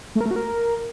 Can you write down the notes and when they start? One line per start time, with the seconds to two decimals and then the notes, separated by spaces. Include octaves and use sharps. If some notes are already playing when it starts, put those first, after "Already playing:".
0.15 A3
0.21 A#4
0.26 A3
0.31 F#4
0.36 A#4